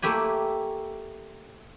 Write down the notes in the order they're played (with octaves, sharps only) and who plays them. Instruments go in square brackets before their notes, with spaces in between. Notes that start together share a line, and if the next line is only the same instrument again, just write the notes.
[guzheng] A3 A#3 E4 G4 G#5